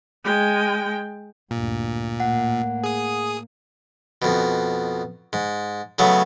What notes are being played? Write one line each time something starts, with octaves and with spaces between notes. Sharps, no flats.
G#3 G5
D2 G2 A#2
A2 A#3 F#5
G#4 D#6
F2 B2
G#2
C#3 F#3 A3 B3